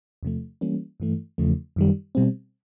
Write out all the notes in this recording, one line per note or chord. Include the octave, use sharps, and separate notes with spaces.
E2 C3 F3 A3
E3 G3 A#3 C#4
G2 E3 A3
E2 C#3 F3 A3
F#2 D#3 G3
B2 G3 C4